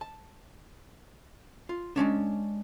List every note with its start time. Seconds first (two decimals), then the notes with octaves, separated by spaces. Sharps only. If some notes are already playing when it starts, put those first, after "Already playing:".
0.01 A5
1.69 F4
1.96 G#3 A#3 C#4 D4